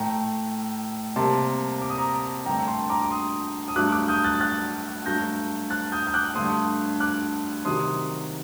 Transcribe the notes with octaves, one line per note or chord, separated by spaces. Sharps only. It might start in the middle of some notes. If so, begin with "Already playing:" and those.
Already playing: A2 A3 G5 A#5
C3 G3 A#3 A5 C6
D6
D#6
A#5 D6
G2 D3 A3 G5 A#5
A5 C6
A#5 D6
D6
C6 D#6
D#6
G2 F#3 A3 D6 F#6
D6 F#6
D#6 G6
F#6 A6
F#6 A6
G2 F#3 A3 G6 A#6
F#6 A6
D#6 G6
G6
D6 F#6
G2 D3 A3 C6 D#6
D6 F#6
C3 D#3 F#3 C6 D#6